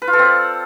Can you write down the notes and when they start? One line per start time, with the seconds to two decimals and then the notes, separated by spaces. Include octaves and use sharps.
0.02 B4
0.07 F4
0.13 A4
0.19 C4
0.25 D5